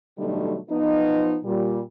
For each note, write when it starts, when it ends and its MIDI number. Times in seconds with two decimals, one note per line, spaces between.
0.18 0.57 47
0.18 0.57 50
0.18 0.57 54
0.18 0.57 55
0.18 0.57 57
0.18 0.57 63
0.69 1.38 53
0.69 1.38 59
0.69 1.38 63
1.45 1.82 46
1.45 1.82 55